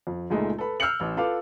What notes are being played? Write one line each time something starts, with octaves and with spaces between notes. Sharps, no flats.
F2
C#2 A#2 G#3 A3 D#4 F4
A4 B4 B5
E6 F6 G6 C7 C#7 F#7
A1 F6
F4 A4 B4 F5 D6